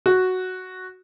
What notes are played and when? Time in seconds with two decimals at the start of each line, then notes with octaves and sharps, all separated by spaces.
0.06 F#4